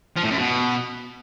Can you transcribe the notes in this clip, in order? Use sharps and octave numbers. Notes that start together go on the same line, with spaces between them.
F3
A2
F#2
B2